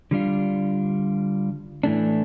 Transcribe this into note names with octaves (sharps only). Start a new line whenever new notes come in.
D3 G3 D4 F4
A2 E3 A3 D4